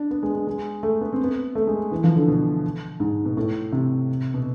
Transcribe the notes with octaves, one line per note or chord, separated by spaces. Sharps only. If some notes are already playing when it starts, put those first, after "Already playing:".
Already playing: D4
B3
G#3
G#3
G#3
A3
B3
C4
B3
A3
G#3
E3
F3
D3
B2
G#2
B2
A2
C3
B2